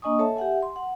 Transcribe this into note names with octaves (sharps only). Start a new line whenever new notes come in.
A#3 D4 D#5 G#5 C#6 D#6
A4 C#5 E5 A5
G4 E5 F#5 G#5
C6
F#5